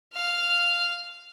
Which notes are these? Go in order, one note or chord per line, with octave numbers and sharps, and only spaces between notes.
F5 F6